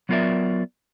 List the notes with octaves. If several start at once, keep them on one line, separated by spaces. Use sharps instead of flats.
F#3 B3 F4 A#4 D5 E5